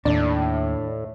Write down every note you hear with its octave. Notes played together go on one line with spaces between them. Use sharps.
D#2 A2 D4